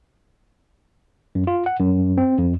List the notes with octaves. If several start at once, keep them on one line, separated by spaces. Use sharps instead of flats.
F#2
F4
F#5
F#2
C4
F2